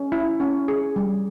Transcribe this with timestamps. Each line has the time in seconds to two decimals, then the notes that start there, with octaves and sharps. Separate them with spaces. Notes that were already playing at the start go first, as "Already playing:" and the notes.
Already playing: C#4
0.12 E4
0.40 C#4
0.68 G#4
0.96 G3